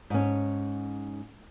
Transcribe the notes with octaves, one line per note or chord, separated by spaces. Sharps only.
G#2 C#4